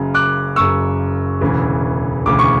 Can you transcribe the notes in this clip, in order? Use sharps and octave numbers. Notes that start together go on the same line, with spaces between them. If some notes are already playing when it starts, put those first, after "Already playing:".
Already playing: F#1 F#2 C#3
D6 F#6
F#1 F#2 C#3 C#6 E6
E1 D2 C#3 E3
E1 D2 C#3 E3 D6
C#6